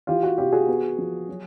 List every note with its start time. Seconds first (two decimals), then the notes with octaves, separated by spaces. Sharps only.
0.07 E3 F4 G4
0.23 F#4
0.38 C3 F4 G4
0.52 F#4 G#4
0.67 B3
0.98 F3
1.29 F#3